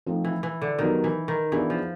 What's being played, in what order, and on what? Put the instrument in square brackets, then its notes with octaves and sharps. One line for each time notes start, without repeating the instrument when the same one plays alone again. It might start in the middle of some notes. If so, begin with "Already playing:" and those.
[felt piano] F3 A3 C4 D#4
[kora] E3
E3
D3
[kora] D#3 [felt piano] F#3 B3 D#4 G4
[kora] E3
D#3
[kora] E3 [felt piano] B3 D4 F4 G#4
[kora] F3